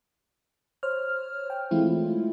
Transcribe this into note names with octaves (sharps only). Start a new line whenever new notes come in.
C5 C#5 F6
G5
E3 G#3 A3 C4 E4 F4